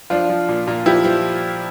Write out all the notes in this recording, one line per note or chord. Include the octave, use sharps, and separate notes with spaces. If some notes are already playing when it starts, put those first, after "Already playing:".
F3 D4 F4
F3
A#2
A#2
F3 E4 G4
F3